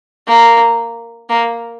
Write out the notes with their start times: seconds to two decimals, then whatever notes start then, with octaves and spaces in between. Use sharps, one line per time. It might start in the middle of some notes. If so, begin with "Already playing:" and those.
0.28 A#3
1.29 A#3